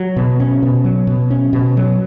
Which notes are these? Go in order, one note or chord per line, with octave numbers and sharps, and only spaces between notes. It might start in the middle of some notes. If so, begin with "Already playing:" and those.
Already playing: F#3
B2
C#4
B2
F#3
B2
C#4
B2
F#3